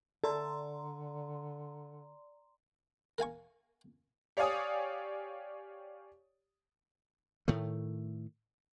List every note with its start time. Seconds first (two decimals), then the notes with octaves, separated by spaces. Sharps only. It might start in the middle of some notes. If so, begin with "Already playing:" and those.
0.24 D3 A4 D5 A#5 C6
3.18 A#4 F5 G#5 C#6
4.37 G4 C#5 D5 F5 G#5 D#6
7.48 A2 D#3 A3